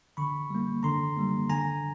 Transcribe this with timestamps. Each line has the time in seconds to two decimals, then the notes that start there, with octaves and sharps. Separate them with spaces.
0.17 D3 B5 C#6
0.50 G3 A#3
0.83 D3 A#5 C6
1.17 G3 A#3
1.49 D3 G#5 A#5